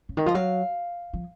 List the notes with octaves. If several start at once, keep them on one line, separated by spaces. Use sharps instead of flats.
C#3
D#3
F3 D#5
F#3 F5
F3